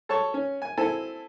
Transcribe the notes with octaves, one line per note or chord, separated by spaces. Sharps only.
A4 C#5 A5 C#6
C#4
G#5
C4 E4 A4 G#5